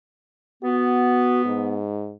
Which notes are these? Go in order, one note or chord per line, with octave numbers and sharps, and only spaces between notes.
B3 F#4
G#2